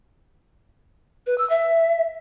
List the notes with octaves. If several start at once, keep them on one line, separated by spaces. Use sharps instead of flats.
B4
E6
E5